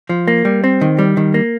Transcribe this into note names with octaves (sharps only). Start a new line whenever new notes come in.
F3
A#3
G3
C4
D#3
G3
D#3
A#3